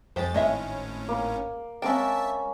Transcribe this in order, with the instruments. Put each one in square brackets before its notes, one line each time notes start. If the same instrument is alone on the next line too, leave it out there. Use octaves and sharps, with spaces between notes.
[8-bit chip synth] F2 A6 [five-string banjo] G#3 G4 C5
[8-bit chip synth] G#1 A2 C#4 [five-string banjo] G#3 D#5 E5
[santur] A#3
[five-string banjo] G#3 C4 G5 [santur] A#3 C#4 [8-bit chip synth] E5 A5